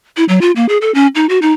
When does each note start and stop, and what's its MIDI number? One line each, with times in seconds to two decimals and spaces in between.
0.17 0.24 64
0.29 0.39 54
0.41 0.51 65
0.56 0.68 58
0.69 0.78 68
0.81 0.93 69
0.94 1.07 61
1.15 1.26 63
1.29 1.39 66
1.42 1.53 63